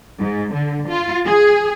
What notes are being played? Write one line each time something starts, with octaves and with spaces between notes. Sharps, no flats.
G#2
D3
F4
G#4